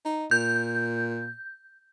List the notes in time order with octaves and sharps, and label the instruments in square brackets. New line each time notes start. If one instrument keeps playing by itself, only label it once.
[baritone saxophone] D#4
[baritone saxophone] A#2 [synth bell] G6